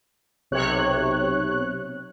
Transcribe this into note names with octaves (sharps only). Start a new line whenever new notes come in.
B1 C3 C#5 F#6